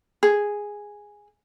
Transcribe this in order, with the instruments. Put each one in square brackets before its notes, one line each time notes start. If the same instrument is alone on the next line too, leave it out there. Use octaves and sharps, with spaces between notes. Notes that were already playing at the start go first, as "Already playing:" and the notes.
[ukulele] G#4